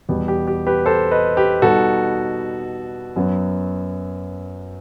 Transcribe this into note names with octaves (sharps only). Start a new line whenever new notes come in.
E2 B2 G3 B3 G4
G4
G4
G4 B4
A4 C5
B4 D#5
G4 B4
B2 G3 B3 D#4 F#4 A4
F#2 F#3 B3